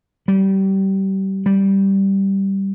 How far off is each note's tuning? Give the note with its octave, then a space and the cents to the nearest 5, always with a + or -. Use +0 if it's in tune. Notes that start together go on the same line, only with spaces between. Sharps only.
G3 -25
G3 -5